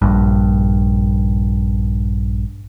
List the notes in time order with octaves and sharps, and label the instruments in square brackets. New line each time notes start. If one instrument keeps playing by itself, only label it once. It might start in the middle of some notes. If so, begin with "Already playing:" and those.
[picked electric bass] A#1 G2